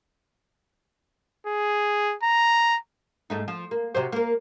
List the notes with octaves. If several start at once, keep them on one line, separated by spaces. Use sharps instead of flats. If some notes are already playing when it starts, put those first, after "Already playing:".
G#4
A#5
G#2 A3 D#4
F3
A#3
C3 F#3 C5
A#3 A#4